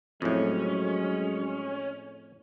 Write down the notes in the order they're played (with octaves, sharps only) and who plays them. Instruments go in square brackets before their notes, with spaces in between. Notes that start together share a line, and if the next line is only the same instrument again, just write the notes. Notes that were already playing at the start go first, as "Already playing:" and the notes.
[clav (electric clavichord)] F2 A2 [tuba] F#3 [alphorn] G#3 [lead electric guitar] C#4